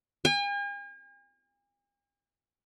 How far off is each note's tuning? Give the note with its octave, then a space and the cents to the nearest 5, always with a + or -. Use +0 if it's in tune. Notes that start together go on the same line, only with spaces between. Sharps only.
G#5 -45